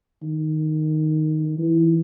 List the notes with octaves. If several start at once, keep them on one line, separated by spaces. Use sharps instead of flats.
D#3
E3